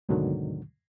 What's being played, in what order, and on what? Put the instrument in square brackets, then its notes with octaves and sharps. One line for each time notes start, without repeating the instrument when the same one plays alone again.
[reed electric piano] D2 G#2 B2 D3 D#3 F#3